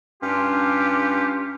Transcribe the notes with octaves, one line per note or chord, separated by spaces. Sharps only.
G2 C#4 D4 F4 G4